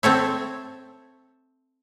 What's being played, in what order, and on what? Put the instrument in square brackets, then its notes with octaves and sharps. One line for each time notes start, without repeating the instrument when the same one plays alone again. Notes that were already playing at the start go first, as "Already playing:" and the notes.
[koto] C4 A4 C#5 E5